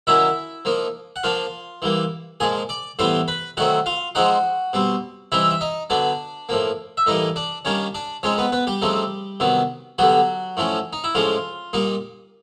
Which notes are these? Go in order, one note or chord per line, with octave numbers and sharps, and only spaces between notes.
D#3 F#3 A#3 C#4 E4 E5
F3 A#3 D#4
F#5
F3 A#3 D4 F4 F5
E3 G3 A#3
A#2 F3 G#3 G#4 G#5
D5 D6
A2 E3 G3 B3 C5 C6
B4 B5
D#3 F#3 A3 C4 F#4 F#5
F4 F5
F3 G#3 C4 D#4 F#4 F#5
B2 G3 C4
E3 G3 C4 D#4 E4 E5
E5
D#4 D#5
D3 F#3 B3 D4 D5
A2 F3 A#3
E5
A2 E3 G3 A#3 D#4 D#5
D4 D5
D#3 G3 A#3 C#4 D4 C#5
D4 D5
F3 G#3 C4 C#4 D#4 C#5
B3 B4
B3 B4
G3 G4
C#3 F3 A3 C4 D#4
C3 D#3 F#3 B3
D3 F#3 G3 B3 F#4
A2 F3 A3 C#4
D#4
E4
A2 F3 G#3 C#4 F4
A#2 G3 A#3 D#4